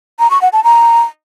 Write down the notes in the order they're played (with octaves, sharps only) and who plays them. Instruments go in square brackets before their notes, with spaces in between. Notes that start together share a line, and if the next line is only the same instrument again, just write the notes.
[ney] A#5
C#6
F#5
A5
A#5